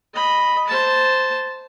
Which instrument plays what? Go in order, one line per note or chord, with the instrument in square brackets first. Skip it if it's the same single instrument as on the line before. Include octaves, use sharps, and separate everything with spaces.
[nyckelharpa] D#5 B5
C5 A5